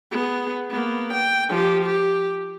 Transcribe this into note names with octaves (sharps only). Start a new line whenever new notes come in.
B3 G#4
A#3 B3
G5
F3 G4
G4